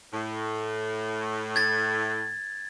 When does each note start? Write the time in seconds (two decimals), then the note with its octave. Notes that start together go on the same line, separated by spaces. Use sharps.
0.12 A2
1.56 G#6 A6